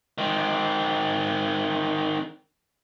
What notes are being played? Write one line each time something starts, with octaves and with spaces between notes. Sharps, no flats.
D#3 C4